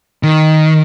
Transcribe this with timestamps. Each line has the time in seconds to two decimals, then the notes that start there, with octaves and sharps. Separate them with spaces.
0.23 D#3